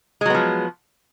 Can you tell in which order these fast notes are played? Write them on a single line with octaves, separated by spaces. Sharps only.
G#3 F#3 B3 F3